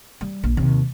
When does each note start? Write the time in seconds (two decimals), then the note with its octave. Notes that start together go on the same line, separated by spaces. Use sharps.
0.21 G3
0.43 A#1
0.57 D#2 C3